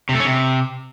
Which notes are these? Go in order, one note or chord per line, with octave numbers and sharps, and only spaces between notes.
C3
A3
C#4
C3